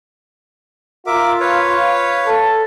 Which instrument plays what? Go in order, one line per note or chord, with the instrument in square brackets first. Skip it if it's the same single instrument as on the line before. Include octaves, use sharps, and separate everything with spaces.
[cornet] F4 [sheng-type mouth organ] A#4 E5 D6
[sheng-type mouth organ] B4 C#5 F5
[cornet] A4